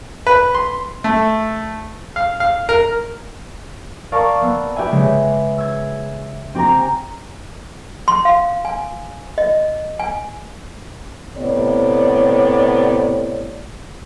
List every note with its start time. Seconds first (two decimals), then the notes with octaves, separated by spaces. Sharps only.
0.27 B4
0.55 C6
1.04 A3
2.16 F5
2.40 F5
2.69 A#4
4.12 A#4 D5 F5 A5 C#6 D#6
4.42 B3 E6
4.76 G4 B4 E5 G#5
4.92 C#3 G#3
5.58 E6 G#6
6.55 C4 G4 G#5 A#5
8.08 C6
8.25 F5
8.65 G#5
9.38 D#5
10.00 G#5
11.36 A2 C3 B3 C#5 D5